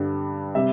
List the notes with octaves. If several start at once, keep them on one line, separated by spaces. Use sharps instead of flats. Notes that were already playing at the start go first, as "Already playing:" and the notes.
Already playing: G2 D3 G3
C3 G3 E5